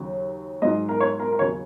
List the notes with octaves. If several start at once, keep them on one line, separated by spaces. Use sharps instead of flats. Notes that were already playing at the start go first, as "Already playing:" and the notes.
Already playing: D#2 C#3 F#3
G#2 F#3 D#5
A#4
C#5
A#4
A#4
D#2 C#3 F#3 C#5